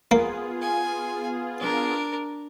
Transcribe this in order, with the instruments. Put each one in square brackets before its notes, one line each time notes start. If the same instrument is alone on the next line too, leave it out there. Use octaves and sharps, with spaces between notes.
[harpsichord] A#3 [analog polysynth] B3 F4 G#4
[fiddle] G#5
D4 A#4